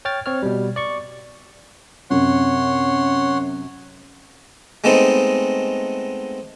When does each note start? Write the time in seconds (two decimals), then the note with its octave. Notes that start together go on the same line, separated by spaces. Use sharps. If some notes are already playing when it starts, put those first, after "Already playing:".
0.05 C#5 G5 F6 A6
0.26 C4 C#5 F6
0.42 B2 G3
0.76 D5 C#6
2.10 F#2 C3 C#5 F#5 C6
4.84 G#3 A3 B3 C4 D#4